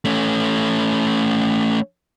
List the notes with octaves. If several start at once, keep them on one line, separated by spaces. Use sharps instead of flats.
A3 C#4